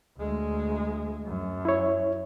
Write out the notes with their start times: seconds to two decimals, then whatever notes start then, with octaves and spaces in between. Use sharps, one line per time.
0.17 D2 G#3
1.26 F#2
1.65 E4 C#5